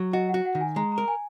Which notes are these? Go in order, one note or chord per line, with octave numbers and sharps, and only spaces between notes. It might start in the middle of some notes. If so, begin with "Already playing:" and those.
Already playing: F#3
F#4 D#5
F#5
F#4
F#5
D#3
G#5
G#3 A#5
A#5
A#4
G#5